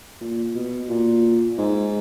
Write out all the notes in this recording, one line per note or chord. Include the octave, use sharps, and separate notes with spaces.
A#2
B2
A#2
G#2